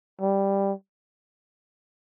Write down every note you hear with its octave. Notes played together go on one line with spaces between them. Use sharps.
G3